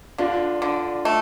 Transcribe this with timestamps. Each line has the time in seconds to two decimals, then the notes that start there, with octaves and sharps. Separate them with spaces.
0.18 D3 D4 F4
0.62 D3
1.05 A3